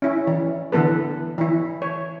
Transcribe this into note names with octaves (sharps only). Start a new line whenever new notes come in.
C#4 E4
E3
D3 E3 B3 A4 B4
E3 E4
C#5